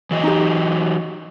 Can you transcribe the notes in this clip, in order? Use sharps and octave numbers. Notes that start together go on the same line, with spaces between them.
E3 F#3 D#5
D#4 G4